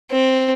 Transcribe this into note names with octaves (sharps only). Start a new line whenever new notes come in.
C4